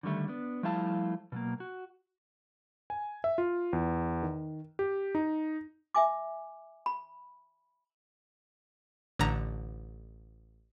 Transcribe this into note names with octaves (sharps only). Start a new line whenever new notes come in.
D3 D#3 G3 A3
B3 D4
F3 G3 A3 E4 F5 A5
B2 F#3 A#3
F#4
G#5
E5
F4
E2
D#3
G4
D#4
E5 G#5 D6
B5
A1 D3 A#5